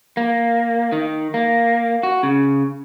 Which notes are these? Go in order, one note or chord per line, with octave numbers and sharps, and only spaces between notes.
A#3
D#3
A#3
F#4
C#3